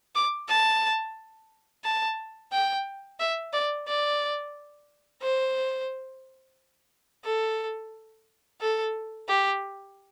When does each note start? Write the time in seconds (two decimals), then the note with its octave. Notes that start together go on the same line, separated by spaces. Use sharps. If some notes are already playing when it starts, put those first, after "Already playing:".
0.15 D6
0.49 A5
1.84 A5
2.52 G5
3.20 E5
3.53 D5
3.87 D5
5.22 C5
7.25 A4
8.61 A4
9.28 G4